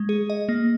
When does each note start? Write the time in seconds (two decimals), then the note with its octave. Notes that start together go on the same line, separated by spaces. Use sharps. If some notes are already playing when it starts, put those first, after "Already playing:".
Already playing: G#3
0.09 G#4
0.30 D#5
0.49 A#3